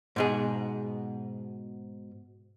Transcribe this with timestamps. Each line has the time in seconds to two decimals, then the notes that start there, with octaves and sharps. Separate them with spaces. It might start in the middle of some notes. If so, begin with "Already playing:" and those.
0.16 G#2 B2 G#4